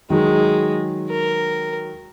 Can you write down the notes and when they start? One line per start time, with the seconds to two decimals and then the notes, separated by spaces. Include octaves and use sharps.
0.10 D#3 F#3 G#3
1.10 A#4